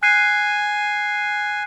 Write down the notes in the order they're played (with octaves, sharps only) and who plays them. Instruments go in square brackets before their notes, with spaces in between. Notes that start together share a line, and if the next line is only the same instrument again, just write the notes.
[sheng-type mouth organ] G#5 [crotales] F#6 C7 D#7